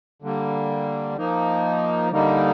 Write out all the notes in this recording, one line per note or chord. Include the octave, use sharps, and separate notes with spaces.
D3 G3 A#3
F3 A#3 D#4
D3 G3 A#3 D#4